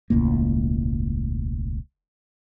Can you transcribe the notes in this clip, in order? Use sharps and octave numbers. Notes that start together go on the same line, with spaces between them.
E1 C#2 A2 A#3